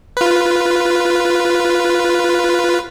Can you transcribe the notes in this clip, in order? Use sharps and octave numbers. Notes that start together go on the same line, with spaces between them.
F4 B4